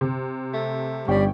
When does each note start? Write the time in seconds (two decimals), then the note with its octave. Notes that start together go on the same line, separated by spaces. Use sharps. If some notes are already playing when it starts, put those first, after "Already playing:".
0.01 C3
0.54 A3
1.08 G1 G3 C#4 G5 C#6